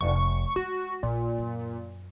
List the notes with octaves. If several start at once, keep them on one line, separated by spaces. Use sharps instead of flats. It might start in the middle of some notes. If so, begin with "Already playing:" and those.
F1 C#6
G#3 F#4
A#1 A#2
F#2